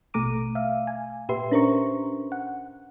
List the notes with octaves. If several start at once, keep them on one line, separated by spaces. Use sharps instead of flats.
A1 B2 A3 A#5 D6 D#7
E5 F5
G#5
A#2 G4 B4 E5 C6
C#4 D4 A#4 C5 A#5 C#6
F#5